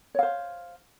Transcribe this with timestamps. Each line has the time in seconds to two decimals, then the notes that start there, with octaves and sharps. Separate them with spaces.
0.15 C#5
0.19 F5
0.23 C5